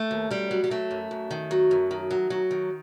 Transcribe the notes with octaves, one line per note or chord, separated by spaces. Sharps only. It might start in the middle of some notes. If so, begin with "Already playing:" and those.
Already playing: A3
D#2
F#2 G3
F#3
G3
F#3 A3
F#2
F#2
D#3
F#3
F#2
D#3
F#3
F#3
D#3